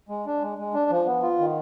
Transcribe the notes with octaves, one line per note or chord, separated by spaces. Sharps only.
G#3
D4
G#3
G#3
D4
F3
B3
F4
D#3